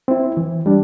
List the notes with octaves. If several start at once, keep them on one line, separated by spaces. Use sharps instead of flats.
C4 E4
E3
G3 D4